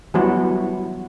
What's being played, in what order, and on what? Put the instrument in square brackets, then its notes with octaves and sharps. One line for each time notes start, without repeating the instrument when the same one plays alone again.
[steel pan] E3 F#3 G3 B3 E4 F#4